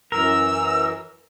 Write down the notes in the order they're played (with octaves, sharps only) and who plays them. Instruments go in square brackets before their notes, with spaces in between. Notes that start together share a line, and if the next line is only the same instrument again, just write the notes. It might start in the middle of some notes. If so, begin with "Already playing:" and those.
[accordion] F#2 E3 [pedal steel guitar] A#4 [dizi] E6